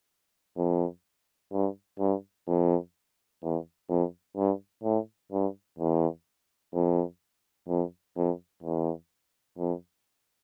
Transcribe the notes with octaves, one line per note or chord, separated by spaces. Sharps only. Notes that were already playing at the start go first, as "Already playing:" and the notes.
F2
G2
G2
F2
E2
F2
G2
A2
G2
E2
F2
F2
F2
E2
F2